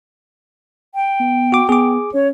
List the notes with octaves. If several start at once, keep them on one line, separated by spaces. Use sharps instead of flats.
G5
B3
F#4 D6
B3 G#4 D6
C#4 C#5